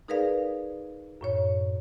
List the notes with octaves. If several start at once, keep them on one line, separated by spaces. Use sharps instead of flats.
D#4 G#4 A#4 B4 D5 F5
F#2 A2 C#5